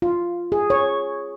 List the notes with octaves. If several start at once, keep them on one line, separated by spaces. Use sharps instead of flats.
F4
G#4
C#5